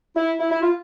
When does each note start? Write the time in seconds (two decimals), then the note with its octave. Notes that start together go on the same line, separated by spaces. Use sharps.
0.16 E4
0.39 E4
0.51 E4
0.62 F4